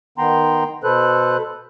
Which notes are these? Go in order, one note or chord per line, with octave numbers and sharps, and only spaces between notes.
D#3 B3 G5 A#5 C6
B2 A4 B4 C5 F#6